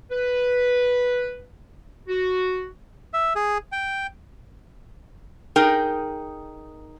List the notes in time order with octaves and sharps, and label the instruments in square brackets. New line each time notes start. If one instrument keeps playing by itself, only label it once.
[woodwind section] B4
F#4
[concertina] E5
G#4
G5
[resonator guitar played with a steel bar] D#4 G#4 A#4 G5